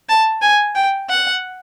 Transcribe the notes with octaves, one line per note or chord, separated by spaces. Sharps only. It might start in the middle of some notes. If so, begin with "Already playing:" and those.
A5
G#5
G5
F#5